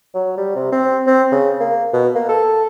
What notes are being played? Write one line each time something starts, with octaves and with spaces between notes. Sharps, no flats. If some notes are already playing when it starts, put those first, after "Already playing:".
F#3
G3
C3
C4
C4
C#3
A#3
B2
A#3
A4